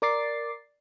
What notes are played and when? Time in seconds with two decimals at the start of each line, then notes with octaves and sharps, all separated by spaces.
0.02 A#4 D5 D6 A6 C7